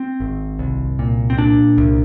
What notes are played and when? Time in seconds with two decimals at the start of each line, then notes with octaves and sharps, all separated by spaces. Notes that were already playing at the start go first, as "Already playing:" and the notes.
Already playing: C4
0.20 G#1
0.59 C2
0.99 A#2
1.30 C4
1.38 A#2 D4
1.78 C2